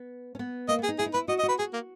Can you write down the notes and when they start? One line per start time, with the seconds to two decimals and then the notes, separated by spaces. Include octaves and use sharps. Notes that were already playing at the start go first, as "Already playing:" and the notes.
Already playing: B3
0.35 C#4
0.39 B3
0.68 A#3 D#5
0.79 B3
0.84 G#4
0.89 D#4
0.99 E4 G#4
1.06 D#4
1.14 E4 B4
1.28 F#4 D#5
1.39 D#5
1.43 F#4
1.48 B4
1.59 F#4 G#4
1.73 A#3